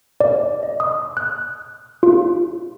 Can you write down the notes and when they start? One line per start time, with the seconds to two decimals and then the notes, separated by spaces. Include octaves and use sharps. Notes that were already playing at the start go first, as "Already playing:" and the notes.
0.20 D5
0.63 D#5
0.80 D#6
1.17 F#6
2.03 F4